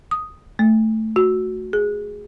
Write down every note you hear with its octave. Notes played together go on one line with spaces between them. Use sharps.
D#6
A3
F#4
G#4